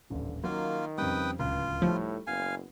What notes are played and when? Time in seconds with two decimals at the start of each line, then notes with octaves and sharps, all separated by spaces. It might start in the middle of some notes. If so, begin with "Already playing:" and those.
0.10 D#1 A1 D3
0.44 D#3 F#3 A#3 C#4 F4
0.98 F2 C#3 G3 B4 G5 D#6
1.39 D1 C#2 F4
1.82 A2 F3 G3 A3 D#4
2.27 F#1 B3 F5 G#5